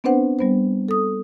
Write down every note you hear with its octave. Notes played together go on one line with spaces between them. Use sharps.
B3 C4 D4 B4 C5 F#5
G3 B3 C5
A4 D#6